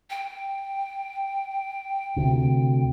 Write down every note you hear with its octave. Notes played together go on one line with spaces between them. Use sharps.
G5
D2 C3